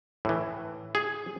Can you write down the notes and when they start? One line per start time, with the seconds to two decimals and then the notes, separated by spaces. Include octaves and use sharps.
0.25 A2 E3
0.95 G#4